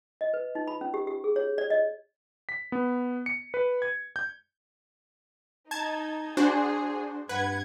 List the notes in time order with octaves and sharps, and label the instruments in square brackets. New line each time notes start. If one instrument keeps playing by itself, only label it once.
[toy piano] D#5
B4
D#4
B5
C#4
G4
G4
G#4
C#5
D5
D#5
[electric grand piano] B6
B3
C#7
B4
G#6
G6
[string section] D#4 [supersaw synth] A5 G#6
[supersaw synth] D4 F#4 C5 [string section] G#4
[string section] G2 F#5 G#6 [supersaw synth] B4